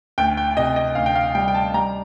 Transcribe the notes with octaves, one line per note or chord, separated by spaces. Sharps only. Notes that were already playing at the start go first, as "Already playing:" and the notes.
D2 G5
G5
C3 D#5
D#5
D2 F5
G5
F5
G3 G5
G5
A5
G3 A#5